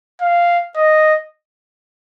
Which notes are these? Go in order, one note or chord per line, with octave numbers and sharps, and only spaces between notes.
F5
D#5